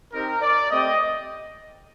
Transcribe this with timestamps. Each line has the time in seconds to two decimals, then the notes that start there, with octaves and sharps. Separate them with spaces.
0.13 C4 D#4 G4 A#4
0.42 D5
0.70 A3 C4 G4 D#5